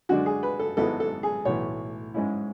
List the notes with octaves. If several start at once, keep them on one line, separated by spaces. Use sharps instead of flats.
F#2 D3 G#3 D4 F#4
G#4
B4
A4
G#1 G#2 G#3 B3 E4 A4
A4
G#4
B1 A2 E3 C#5
G#2 G#3 C#4 E4